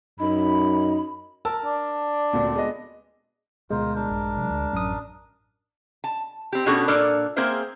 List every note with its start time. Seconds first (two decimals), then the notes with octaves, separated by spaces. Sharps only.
0.19 F#2 D#4 B5
1.45 A#4 A5 E6
1.65 D4
2.33 D2 A#2 C4
2.55 G#3 B3 D#5
3.70 D2 B2 G#3 F4 A#4 C5
3.95 D4 A#4
4.10 A#1 G2
4.37 C3 D#3 F#3
4.50 D2
4.73 A1 F#2 D#6
6.04 A5
6.53 C4 G4
6.66 B2 C#4 D4 F#4 G#4 A4
6.88 A#2 D4 A4 A#4 D5
7.36 A#3 C4 G#4 A#4 C5 E5